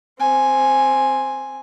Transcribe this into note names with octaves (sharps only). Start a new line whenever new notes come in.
C4 G#5